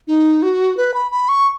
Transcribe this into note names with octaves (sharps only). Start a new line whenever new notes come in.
D#4
F#4
B4
B5
B5
C#6